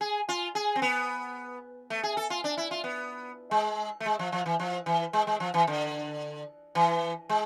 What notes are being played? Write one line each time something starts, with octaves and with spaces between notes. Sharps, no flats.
G#4
F4
G#4
C4
B3
A3
G#4
A4
F4
D4
E4
F4
B3
G#3
A3
G#3
F3
F3
E3
F3
E3
G#3
G#3
F3
E3
D3
E3
G#3